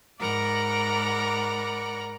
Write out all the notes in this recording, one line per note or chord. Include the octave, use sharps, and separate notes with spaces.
G#2 A#4 D5 F#5 A#5 B5